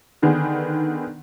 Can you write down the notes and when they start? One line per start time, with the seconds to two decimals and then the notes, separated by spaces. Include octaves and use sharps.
0.22 D3 D#3 B3 G#4